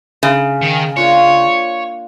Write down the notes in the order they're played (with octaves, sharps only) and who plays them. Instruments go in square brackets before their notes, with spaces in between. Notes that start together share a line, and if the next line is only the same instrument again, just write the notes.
[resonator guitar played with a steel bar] C#3
[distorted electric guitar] D#3
[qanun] A#3 D4 F4 [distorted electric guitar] C#5